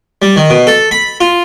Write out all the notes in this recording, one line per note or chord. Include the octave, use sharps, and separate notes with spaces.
G3
D#3
B2
A4
B5
F4